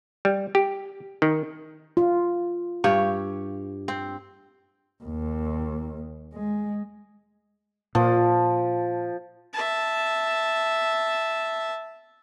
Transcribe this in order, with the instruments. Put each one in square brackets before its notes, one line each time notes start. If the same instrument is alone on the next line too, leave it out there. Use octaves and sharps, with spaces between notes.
[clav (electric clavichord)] G3
G4
D#3
[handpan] F4
[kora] G2 G4 C#5
C4
[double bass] D#2
G#3
[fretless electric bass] A#2 [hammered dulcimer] F3
[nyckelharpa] E5 A5